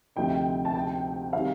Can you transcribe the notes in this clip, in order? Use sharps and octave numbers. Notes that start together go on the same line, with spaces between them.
D2 C3 F3 A3 D#4 G5
A5
G5
C3 D#3 G3 F5